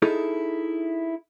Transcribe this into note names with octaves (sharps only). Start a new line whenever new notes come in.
D#4 E4 G#4 A4